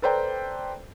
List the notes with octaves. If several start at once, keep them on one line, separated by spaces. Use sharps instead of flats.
A4 B4 C5 D5 G5 A#5